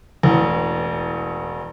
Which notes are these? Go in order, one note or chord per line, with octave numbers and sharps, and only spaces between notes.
E1 A1